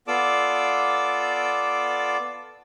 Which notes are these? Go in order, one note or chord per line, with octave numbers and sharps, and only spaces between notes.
B3 F4 A4 D5 D6 E6